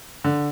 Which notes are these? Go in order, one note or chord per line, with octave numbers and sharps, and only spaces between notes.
D3